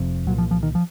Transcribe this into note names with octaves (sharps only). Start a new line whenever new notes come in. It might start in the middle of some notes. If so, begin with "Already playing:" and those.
Already playing: F1 F2 C3
C2 A#2 F#3
F3
F3
D#3
F3